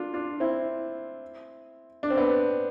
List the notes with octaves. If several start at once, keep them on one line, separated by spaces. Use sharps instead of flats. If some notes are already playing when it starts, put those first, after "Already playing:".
Already playing: D4 F4
D4 F4
C4 E4
D4
C4
B3 D4